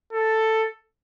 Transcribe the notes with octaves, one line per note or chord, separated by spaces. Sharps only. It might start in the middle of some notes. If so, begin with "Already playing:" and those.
A4